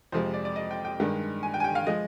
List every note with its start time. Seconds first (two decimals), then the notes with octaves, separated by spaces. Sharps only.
0.12 F2 C3 F3 G#3 C5
0.34 D5
0.45 D5
0.56 D#5
0.71 G5
0.85 G5
1.00 G2 D#3 G#3
1.43 G#5
1.54 G5
1.60 G#5
1.64 G5
1.75 F5
1.87 F3 G#3 D#5